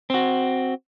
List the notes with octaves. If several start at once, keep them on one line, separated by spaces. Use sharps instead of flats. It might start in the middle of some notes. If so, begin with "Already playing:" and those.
C4 F#4